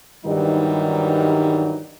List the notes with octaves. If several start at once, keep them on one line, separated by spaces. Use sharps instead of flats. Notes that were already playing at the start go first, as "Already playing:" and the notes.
G2 D#3 E3 F#3 G3 D#4